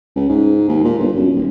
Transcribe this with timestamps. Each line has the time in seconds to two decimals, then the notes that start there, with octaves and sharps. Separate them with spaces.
0.16 C#2
0.29 G#2
0.69 D#2
0.84 A#2
0.99 G1
1.16 F#2
1.35 D#1